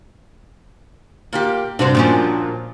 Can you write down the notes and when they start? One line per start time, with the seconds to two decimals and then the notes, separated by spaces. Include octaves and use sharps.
1.33 A#2 A#3 G4
1.79 G2 C3 D4 F#4 C5
1.95 A#2 F3 C#4